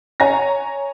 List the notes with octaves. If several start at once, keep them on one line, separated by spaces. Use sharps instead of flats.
C#5 G#5 A#5 A#6